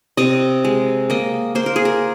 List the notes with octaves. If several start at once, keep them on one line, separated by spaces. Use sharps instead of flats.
C3 D#5
G#3
A#3 D#5
A#3 C5
A#4
G#4
A#4